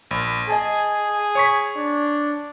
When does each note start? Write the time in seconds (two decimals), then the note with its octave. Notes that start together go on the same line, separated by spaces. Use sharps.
0.11 A#1
0.49 G#4 D#5 G#5 A5
1.35 C#5 C#6 B6
1.76 D4